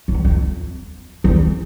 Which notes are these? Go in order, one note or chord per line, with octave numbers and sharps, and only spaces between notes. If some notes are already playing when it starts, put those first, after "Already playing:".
E2
F2
E2